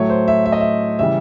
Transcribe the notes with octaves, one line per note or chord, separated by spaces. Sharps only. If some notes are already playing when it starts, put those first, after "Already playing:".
Already playing: A2 F#3 A3 C#5
C5
E5
E5
D#5
E5
C#3 E3 G3 E5